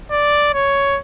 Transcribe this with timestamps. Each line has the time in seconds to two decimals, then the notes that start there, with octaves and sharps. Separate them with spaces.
0.11 D5
0.54 C#5